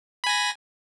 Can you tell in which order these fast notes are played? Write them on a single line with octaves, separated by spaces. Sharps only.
B5 G#5 A#6